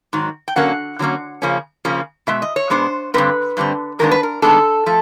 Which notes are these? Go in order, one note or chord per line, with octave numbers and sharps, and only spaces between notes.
G#2 D#3 F#3
G5
D3 F#3 A#3 C#4 F#5
D3 F#3 A#3 C#4
C#3 F3 A#3 C#4
C#3 F3 A#3 C#4
B2 G#3 E5
D#5
C#5
B2 G#3 B3 D4 C5
G2 D3 G3 C4 B4
G2 D3 G3 C4
G2 D#3 G#3 B3 D4 A#4
B4
A#4
G2 D#3 G#3 B3 D4 A4
F3 A3